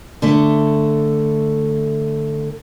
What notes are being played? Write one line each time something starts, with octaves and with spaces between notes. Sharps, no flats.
D3 A3